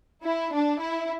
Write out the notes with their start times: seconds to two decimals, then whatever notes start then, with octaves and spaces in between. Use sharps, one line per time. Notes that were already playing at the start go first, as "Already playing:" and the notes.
0.23 E4
0.52 D4
0.79 E4